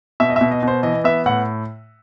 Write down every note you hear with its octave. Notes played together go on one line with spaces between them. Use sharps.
B2 E5
D#5
B2 E5
D#5
B2 C5
E3 D#5
B3 E5
A2 F#5